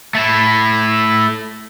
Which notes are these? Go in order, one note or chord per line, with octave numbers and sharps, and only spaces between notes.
A3 E4